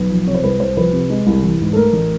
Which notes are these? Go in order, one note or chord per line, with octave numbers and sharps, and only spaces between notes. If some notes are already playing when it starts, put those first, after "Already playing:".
Already playing: B1 B4
F3
C3 C#5
C5
C2 B4
C2 C5
F3 B4
C3
G#3
C2
E3
G#2
A4
A3 A#4
A1